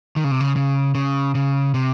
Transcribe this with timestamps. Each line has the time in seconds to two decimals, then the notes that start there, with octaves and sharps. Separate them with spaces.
0.16 D#3
0.24 C#3
0.31 C3
0.40 C#3
0.56 C#3
0.95 C#3
1.35 C#3
1.74 C3